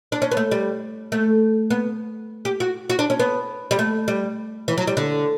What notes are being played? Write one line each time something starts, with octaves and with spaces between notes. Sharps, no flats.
D4
C#4
B3
A3
G3
A3
B3
G4
F#4
F#4
D4
C#4
B3
G3
A3
G3
E3
F#3
G3
D3